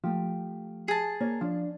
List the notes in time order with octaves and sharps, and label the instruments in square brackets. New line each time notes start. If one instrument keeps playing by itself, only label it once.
[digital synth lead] F3 [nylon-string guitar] A3 G4
[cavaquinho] G#4 A5
[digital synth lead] A#3 [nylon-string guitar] C#5
[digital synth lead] F3 [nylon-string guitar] D4